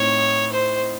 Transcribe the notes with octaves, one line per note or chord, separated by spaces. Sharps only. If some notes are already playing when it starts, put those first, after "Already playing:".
Already playing: A2 C4 D#4 C#5
C5